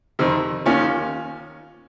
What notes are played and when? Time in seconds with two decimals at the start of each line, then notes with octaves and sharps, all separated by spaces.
0.19 F2 C3 D#3
0.66 D#2 D#3 A#3 C#4 F4